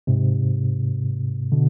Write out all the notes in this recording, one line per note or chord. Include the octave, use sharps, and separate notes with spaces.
G#2 C3
B2 D3